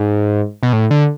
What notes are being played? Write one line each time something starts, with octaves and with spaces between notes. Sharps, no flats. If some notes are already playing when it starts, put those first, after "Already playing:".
Already playing: G#2
B2
A2
D3